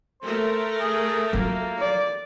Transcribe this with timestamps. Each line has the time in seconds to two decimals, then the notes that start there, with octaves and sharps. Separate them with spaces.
0.22 A3 A#4 C5
0.80 G#4
1.33 F#3 A#3 F4
1.78 D5